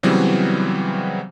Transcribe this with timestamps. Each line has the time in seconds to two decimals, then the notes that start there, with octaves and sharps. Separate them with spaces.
0.03 C#3 E3 F#3 G3 B3 C4